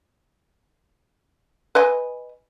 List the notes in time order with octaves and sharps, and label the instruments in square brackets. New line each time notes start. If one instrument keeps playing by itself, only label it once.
[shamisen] B4 D#5 G#5